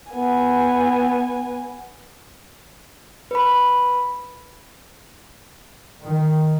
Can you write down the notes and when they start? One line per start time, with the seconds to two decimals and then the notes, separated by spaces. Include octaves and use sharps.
0.13 B3 G#5
3.31 B4 B5
6.02 D#3